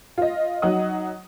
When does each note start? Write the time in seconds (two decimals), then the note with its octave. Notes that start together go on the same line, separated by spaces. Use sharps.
0.18 F4 D#5
0.62 F#3 D#4 F#5 D#6